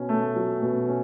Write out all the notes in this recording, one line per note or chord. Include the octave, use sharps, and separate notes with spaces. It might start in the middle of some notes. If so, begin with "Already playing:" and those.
Already playing: B2 C#4
A3
F#3
B2
C#4